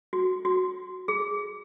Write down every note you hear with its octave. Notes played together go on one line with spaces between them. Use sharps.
F#4
F#4
G#4